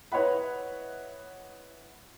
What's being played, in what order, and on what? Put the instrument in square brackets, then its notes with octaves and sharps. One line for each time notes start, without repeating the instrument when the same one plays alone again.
[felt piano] E4 B4 C#5 D#5 F#5 B5